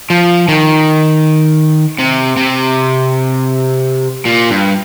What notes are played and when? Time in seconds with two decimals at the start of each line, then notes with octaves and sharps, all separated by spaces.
0.10 F3
0.48 D#3
1.99 C3
2.37 C3
4.26 A#2
4.51 G2